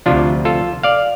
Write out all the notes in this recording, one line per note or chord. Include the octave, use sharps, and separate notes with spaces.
D2 C3 F3 D4 F4
F4 A4
D5 F5